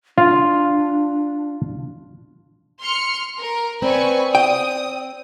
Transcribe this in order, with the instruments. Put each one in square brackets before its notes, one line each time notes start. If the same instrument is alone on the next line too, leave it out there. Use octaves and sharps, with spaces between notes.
[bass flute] D4 [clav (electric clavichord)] F4
[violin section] C6 F6 C#7
A#4
[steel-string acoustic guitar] C4 [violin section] B4 G#5 C#6 [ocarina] D5
[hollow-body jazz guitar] G5 [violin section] D#6